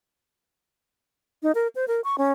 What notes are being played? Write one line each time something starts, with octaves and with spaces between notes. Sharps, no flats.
D#4
A#4
C5
A#4
C#6
C#4